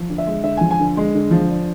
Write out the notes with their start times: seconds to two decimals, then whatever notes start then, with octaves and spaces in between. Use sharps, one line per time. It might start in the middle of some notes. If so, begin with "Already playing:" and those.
Already playing: F3
0.10 D3
0.18 E5
0.27 G#3
0.43 D3 E5
0.57 F3 G#5
0.71 G#5
0.79 D3
0.97 G#3
1.15 D3
1.31 F3
1.50 D4